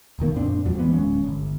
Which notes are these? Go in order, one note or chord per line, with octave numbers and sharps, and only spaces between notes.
E1 C#2 D#3 A#3
F#2 A#2 C4 D4
E2 G#2 F3 F#3
E3 G#3 B3
D1 G#3 C#4
D1 G1